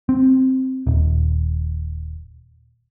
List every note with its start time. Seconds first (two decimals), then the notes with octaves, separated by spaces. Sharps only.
0.09 C4
0.87 D#1